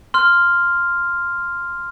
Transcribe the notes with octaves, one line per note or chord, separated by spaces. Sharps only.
C6 F6